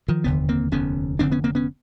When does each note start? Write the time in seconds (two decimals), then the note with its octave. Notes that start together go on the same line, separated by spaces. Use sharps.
0.08 D#3 F3
0.24 F1 D#2 D3 B3
0.49 A#3 C4
0.72 F1 D#2 D3 B3 C#4
1.19 F1 D#2 D3 C4 D4
1.32 B3 C#4
1.44 A#3 C4
1.55 B3 C#4